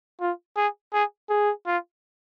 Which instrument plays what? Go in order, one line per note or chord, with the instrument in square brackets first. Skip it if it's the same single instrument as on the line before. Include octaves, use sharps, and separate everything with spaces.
[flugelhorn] F4
[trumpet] G#4
G#4
[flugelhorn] G#4
[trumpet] F4